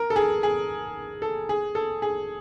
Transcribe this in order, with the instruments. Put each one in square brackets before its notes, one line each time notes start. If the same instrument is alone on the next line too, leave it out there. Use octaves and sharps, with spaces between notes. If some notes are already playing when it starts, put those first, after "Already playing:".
Already playing: [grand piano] A#4
A4
G#4
G#4
A4
G#4
A4
G#4